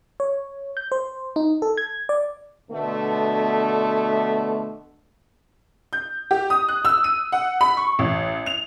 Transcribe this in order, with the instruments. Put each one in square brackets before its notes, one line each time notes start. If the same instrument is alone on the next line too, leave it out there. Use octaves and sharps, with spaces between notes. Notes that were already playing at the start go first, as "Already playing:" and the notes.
[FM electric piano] C#5
G6
C5
D#4
A4
G#6
D5
[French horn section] B2 D3 A3
[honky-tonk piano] G6
G4
D#6
F#6
E6
D#7
F#5
B5
C#6
A1
F7